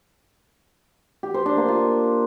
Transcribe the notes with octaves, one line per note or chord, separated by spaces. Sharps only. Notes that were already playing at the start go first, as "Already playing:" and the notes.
G4
C5
D4
A#3
F4